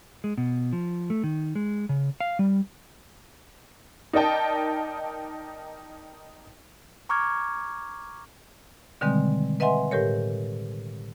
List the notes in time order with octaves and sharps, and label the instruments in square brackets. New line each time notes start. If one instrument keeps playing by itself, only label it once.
[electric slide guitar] G#3
B2
F3
A3
D#3
G#3
C#3
F5
G3
[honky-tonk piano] D#4 A#4 D5 D#5 G5 A5
[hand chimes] A#5 C#6 D6 F6 G#6
[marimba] B2 D3 D#3 G3 G#3 C4
B4 D#5 E5 F#5 G#5 C6
A2 G4 A#4 C#5